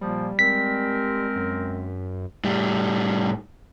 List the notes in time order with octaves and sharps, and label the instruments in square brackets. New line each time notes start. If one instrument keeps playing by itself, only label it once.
[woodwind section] A#2 F3 A#3 [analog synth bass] G3
[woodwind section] G#3 C4 A#4 [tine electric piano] B6
[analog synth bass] F#2
[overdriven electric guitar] A2 G3